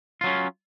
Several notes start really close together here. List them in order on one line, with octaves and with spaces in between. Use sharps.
F4 F#3 C#4